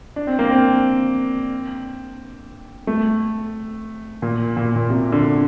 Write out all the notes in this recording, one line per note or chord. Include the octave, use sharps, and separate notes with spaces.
D4
C4
A#3
C4
A3
A#2
A#2
A#2
C3
D3